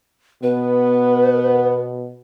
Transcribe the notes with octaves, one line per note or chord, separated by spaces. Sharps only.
B2 B3 B4